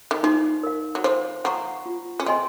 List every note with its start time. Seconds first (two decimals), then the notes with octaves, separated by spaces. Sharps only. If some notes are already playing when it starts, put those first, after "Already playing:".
0.11 D#3
0.23 F3 D#4
0.63 A#4 F5
0.95 F#3
1.04 F3 C5
1.44 F3 F#5 A#5 C#6
1.86 F4
2.20 C#4
2.26 C4 G#4 D#5 G#5 C6